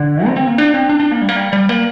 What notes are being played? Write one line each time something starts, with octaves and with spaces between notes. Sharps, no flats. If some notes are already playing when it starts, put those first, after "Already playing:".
Already playing: D3
C4
C4
A#3
D4
C4
D4
D4
A#3
G3
A#3
G3
G3
A#3